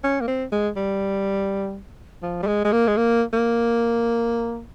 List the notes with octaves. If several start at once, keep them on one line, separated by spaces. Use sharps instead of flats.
C#4
A#3
C4
G#3
G3
F3
G3
G#3
G#3
A#3
G#3
A#3
A#3